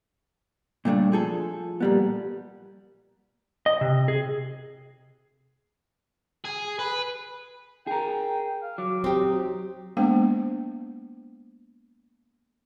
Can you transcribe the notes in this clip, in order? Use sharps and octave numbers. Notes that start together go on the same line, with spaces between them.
A#2 G3 A3 D4
F3 G#4 A4
A#2 G3 B3
D#5
C3
G#4
G#4
B4
G#4 A#4 G5
F5
F#3 D6
C4 D#4 G4
G#3 A#3 B3 D4 C5 G5